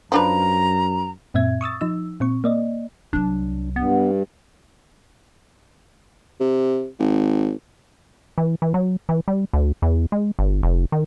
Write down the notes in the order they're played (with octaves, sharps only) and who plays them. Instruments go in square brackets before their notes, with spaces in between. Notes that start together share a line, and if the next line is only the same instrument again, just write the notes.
[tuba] F#2 [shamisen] F3 D4 B4 [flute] A#5
[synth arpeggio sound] F#2 A#2 C4 E5 G#6
C#6 D#6 E6 A6
F3 D#4 E6
A#2 C4 C#6
A#3 D5 D#5
[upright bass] C2 F#3 [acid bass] D4
[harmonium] G2 [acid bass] B3
[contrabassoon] C3
G#1
[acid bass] E3
E3
F#3
E3
G3
D2
E2
G#3
G1
F1
D#3